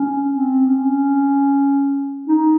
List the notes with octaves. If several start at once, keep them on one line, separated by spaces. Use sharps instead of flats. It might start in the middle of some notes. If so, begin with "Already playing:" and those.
Already playing: C#4
C4
C#4
D#4